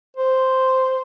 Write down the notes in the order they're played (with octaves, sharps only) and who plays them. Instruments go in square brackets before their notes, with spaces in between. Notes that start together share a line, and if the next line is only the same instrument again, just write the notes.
[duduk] C5